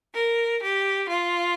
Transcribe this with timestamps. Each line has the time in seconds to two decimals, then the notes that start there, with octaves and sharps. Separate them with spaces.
0.13 A#4
0.61 G4
1.08 F4